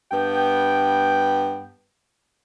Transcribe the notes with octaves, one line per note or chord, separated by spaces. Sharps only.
G2 B3 G5